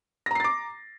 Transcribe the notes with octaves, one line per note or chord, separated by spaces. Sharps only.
A#5 D6 A6 A#6 C7